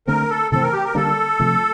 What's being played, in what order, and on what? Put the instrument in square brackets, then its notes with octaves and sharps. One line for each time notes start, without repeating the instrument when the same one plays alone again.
[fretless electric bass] D3 A3 C4 [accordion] A#4
[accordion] A4
[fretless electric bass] C3 E3 A3 C4 [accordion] A4
[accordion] A#4
G4
A#4
[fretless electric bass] D3 G3 A#3 D4 [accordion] A4
[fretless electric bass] C3 F3 A3